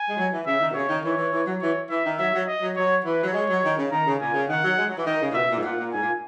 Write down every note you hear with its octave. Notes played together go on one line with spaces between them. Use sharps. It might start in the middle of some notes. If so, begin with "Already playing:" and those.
Already playing: G#5
G#3
F#3
E3
C#3 E5
D#3
B2
C#3 C#5
D#3
E3 C#5
E3
E3
F#3
E3 C#5
E3 E5
D#3
F#3 E5
F#3
D#5
F#3
F#3 C#5
E3 B4
F#3
G#3 C#5
F#3
D#3
C#3
D#3 A#5
C#3
A#2 G#5
C#3
D#3 F#5
F#3
G#3
F#3
E3
D#3 D#5
C#3
A#2
B2 E5
A#2
G#2
A#2 F#5
A#2
G#2 G#5
A#2